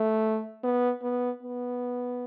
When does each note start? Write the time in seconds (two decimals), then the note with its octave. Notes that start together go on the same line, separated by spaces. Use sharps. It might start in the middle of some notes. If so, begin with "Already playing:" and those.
Already playing: A3
0.63 B3
1.03 B3
1.43 B3